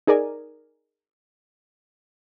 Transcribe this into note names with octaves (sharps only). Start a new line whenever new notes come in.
D#4 G#4 A#4 D5 G#5